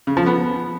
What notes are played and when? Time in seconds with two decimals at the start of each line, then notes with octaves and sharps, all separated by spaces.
0.07 C#3
0.17 F3
0.26 B3